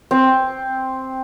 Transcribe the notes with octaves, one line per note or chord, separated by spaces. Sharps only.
C4